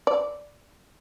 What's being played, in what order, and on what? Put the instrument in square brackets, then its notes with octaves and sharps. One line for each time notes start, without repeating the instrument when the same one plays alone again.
[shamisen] D5